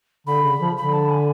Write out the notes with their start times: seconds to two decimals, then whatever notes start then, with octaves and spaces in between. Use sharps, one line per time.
0.27 D3 B5
0.43 C#3
0.60 F3
0.77 D3 B5
0.93 A5
1.10 G#5